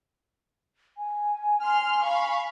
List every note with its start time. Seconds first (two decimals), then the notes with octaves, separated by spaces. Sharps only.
0.98 G#5
1.62 C6 F6
2.03 F5 B5 C#6